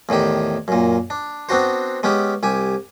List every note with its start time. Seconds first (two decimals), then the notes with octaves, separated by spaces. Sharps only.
0.09 E2 A2 D#3 G4
0.68 F#2 A#2
1.10 D4
1.49 B3 C4 D4 F#4 C5
2.03 G#3 B3 C#4 G4
2.43 C2 G4 G#5